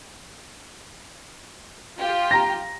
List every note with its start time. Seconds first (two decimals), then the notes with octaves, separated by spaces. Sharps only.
2.01 F4 G4
2.31 A#5 A#6